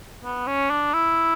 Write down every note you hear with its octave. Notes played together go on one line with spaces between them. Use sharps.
B3
C#4
D4
E4